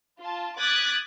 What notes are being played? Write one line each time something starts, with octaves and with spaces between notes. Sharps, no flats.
F4 A5
D6 D#6 F#6 G#6 A6 B6